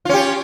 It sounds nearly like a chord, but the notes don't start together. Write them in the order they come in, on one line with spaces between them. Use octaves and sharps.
F4 C#4 G4